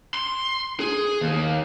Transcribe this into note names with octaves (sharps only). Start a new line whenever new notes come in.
C6
G#4
D#2